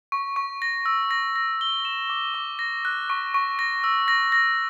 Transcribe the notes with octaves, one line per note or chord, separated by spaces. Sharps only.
C#6
C#6
A#6
E6
A#6
A#6
G7
E7
D6
D6
A#6
F#6
C#6
C#6
A#6
E6
A#6
A#6